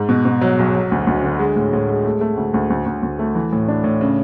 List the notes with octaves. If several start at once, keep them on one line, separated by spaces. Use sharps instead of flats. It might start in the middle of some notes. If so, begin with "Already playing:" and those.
Already playing: G#2
B2
B2
F#3
B1
F#3
D2
D2
D3
G#3
A2
A2
G#3
A3
A3
D2
D2
D2
D2
D2
A3
E3
A2
D4
A2
C#3